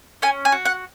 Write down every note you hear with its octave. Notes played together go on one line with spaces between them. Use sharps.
C#4 G#5
G#5
F#4
F#5